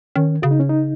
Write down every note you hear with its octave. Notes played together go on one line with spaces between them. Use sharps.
D#3 C#4
C#3 F#4
D#4
C#4
D#4